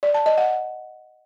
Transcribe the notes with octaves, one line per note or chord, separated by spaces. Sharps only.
D5
A5
D#5
F#5